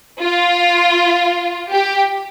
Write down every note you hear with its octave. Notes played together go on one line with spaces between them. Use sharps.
F4
G4